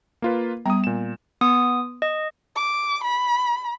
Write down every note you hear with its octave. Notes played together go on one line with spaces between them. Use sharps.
A#3 F4 B4
G3 B3 G5 A#5 D#6
A#2 E7
B3 D#6
D#5
D6
B5